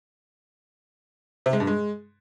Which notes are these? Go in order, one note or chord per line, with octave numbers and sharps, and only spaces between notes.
C3
G#3
G2
G#3